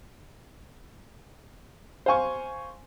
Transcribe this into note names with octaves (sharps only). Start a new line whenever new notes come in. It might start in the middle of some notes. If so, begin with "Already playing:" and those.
C5 F5 G#5 C#6